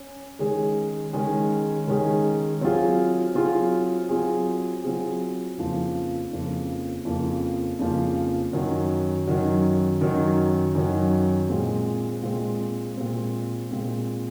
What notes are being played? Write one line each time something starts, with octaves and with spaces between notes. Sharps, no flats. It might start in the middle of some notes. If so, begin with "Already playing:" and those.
Already playing: C#4
D#3 G#3 C#4 G#4
D#3 G#3 C#4 G#4
D#3 G#3 C#4 G#4
F#3 C4 F4 G#4
F#3 C4 F4 G#4
F#3 C4 F4 G#4
F#3 C4 F4 G#4
F2 C#3 F3 A#3
F2 C#3 F3 A#3
F2 C#3 F3 A#3
F2 C#3 F3 A#3
F#2 D#3 F#3
F#2 D#3 F#3
F#2 D#3 F#3
F#2 D#3 F#3
A#2 G#3 C4
A#2 G#3 C4
A#2 G#3 C4
A#2 G#3 C4